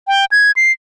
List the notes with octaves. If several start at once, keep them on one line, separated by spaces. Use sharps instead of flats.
G5
G#6
C7